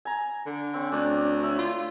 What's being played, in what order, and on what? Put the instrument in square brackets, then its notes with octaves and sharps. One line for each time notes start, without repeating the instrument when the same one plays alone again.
[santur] G#5 A#5
[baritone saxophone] D3
[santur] C4 C#4
[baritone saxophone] D2 [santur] D4
[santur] C#5 E5
[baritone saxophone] F4